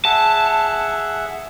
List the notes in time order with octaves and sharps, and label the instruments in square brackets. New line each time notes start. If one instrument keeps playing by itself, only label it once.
[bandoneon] G#4 E5 F#5 [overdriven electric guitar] A5